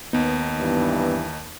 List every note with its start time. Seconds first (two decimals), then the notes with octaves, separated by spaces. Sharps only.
0.13 D#2 B3 D#4
0.57 G2 E3